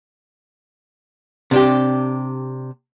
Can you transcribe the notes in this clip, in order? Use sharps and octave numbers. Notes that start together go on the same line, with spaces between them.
C3 D4 G4